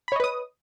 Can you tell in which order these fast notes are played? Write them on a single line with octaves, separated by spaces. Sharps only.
B5 C#5 D#5 B4 D#6